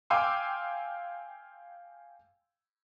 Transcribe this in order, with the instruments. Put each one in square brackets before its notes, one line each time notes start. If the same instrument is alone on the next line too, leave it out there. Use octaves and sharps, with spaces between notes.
[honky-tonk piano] F5 G5 G#5 C6 D6 E6